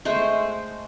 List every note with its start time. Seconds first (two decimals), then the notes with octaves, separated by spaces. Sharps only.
0.05 G#3 A3 C5